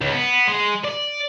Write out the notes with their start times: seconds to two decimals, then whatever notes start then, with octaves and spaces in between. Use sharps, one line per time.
0.01 C#2
0.13 B3
0.48 G#3
0.85 D5